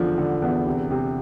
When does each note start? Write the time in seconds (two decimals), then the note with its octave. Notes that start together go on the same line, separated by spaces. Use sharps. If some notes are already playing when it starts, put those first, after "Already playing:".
Already playing: E2 D3 F3
0.18 D3
0.42 E2
0.66 C3
0.91 C3